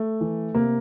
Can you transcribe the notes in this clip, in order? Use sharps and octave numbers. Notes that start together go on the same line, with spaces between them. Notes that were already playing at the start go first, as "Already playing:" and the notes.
Already playing: A3
E3
C3 A#3